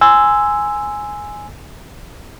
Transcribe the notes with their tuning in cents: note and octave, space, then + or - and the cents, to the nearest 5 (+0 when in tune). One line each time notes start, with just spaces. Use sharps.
G#5 +0 C6 -15 E6 +0